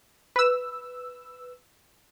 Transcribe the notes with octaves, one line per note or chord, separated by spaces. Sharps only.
B4 E6